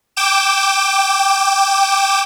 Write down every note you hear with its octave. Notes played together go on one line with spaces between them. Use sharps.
G5 D6 E7